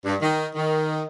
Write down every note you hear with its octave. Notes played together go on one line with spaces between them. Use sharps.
G2
D#3
D#3